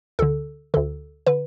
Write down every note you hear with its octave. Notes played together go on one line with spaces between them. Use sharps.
D2 D3 A4
D2 D3 A4
D3 B4